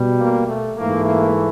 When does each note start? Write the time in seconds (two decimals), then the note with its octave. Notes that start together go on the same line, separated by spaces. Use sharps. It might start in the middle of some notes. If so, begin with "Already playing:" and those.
Already playing: B2 G3
0.19 A#3
0.48 A3
0.77 G#2 E3 A3 A#3
1.05 A#3